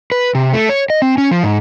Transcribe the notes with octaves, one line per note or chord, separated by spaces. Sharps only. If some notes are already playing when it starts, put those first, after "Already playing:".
B4
C3
A3
C#5
D#5
C4
C#4
F3
G#2